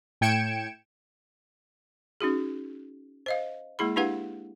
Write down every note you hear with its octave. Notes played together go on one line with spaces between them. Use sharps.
A2 G5 G#6 C#7 D7 E7
C#4 D#4 F#4 G#4
C5 D#5 F5
G#3 A#3 E4 G#4 B5
D4 E4 G4 B4 F5 F#5